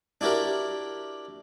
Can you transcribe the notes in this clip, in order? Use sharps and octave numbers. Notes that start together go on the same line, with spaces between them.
D4 E4 F#4 G4 A#4